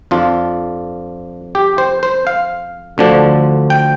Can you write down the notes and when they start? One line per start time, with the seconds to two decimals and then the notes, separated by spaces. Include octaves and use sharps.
0.11 F2 F3 D4 F4
1.55 G4
1.78 C5
2.03 C5
2.27 F5
2.98 D2 D3 F3 D4
3.70 G5